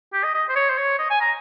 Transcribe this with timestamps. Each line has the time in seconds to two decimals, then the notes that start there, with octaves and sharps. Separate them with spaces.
0.13 G4
0.23 D#5
0.34 D#5
0.49 C5
0.56 C#5
0.70 C5
0.78 C#5
0.98 D#5
1.10 G#5
1.20 A#5